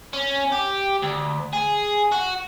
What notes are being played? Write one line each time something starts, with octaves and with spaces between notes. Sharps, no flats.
C#4
G4
D2
G#4
F#4